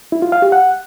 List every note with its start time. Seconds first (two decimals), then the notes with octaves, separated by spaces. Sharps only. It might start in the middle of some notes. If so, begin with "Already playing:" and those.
0.12 E4
0.22 F4
0.32 F5
0.42 G4
0.52 F#5